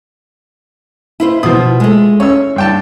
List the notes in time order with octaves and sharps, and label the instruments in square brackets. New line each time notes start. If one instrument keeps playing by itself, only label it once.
[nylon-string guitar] E4 F4 C5
[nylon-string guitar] B2 [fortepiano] F3 D#6
[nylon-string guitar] G#3 A3
[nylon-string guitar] C#4 [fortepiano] C#5 E6
[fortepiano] G2 G5 A5